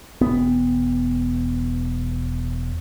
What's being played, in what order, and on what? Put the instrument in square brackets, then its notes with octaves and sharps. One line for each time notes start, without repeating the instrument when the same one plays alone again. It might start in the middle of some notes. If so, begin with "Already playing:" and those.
[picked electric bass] E1 B3